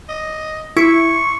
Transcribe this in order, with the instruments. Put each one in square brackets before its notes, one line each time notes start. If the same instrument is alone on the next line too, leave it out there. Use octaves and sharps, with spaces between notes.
[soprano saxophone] D#5
[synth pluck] E4 [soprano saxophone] C#6